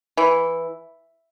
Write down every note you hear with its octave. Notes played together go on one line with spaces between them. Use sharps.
E3